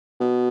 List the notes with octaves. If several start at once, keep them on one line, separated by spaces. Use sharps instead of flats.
B2